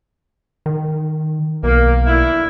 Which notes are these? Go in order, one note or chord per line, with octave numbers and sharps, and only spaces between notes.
D#3
B1 A#3
D3 E4